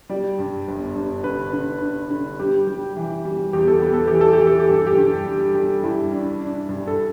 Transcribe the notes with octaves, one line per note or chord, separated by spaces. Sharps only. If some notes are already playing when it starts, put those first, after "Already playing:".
G3 D5
G2
G1
G2
D3 B4
D3
D3
D3
G3 G4
G3
E3
G3
E2 G4
A4
B3 G4
A4
E3 G4
A4
G4
E3
A4
G4
G2 A4
G4
G2
G3
G3
G2 E4
D4
D4
G2
A4